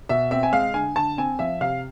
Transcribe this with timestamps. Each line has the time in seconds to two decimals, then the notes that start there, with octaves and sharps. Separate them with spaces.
0.09 B2 E5
0.31 C4 E5
0.43 G#5
0.52 G#3 F5
0.74 D3 G#5
0.95 D3 A5
1.18 C4 G#5
1.39 F3 E5
1.61 C3 F5